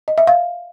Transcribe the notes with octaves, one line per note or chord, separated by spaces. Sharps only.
D#5
E5
F5